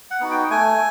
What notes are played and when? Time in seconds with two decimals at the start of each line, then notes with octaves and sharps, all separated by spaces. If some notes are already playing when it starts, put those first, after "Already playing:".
0.11 F#5
0.20 B3 D#4 F#4
0.31 G5
0.50 A3 G#5